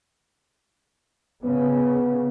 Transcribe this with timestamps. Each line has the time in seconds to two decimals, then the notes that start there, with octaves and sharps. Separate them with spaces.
1.44 C#3 B3